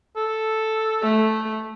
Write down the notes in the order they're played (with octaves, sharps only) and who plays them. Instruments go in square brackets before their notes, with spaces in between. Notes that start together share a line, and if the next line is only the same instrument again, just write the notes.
[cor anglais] A4
[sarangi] A3